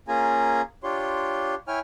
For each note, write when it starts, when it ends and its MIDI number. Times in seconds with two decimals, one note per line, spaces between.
0.08 0.62 58
0.08 0.62 61
0.08 0.62 65
0.08 0.62 68
0.08 0.62 80
0.08 0.62 82
0.83 1.55 62
0.83 1.55 65
0.83 1.55 67
0.83 1.55 73
0.83 1.55 84
1.68 1.80 64
1.68 1.80 73
1.68 1.80 79
1.68 1.80 80
1.68 1.80 89